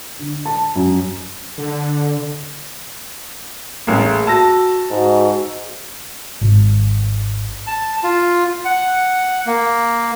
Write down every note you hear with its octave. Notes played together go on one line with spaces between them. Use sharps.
D3
A5
F#2
D3
A1 A#3 G#4
F#4 A5 E6 A#6
G#2 F#4
G#1
A5
F4
F#5
A#3